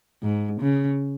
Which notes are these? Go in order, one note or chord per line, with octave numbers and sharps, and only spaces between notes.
G#2
C#3